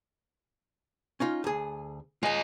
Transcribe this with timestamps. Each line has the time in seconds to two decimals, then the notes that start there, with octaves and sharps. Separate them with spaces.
1.20 C#4 D#4 F4
1.44 D2 G#4
2.23 G#3 F4 D#5 G#5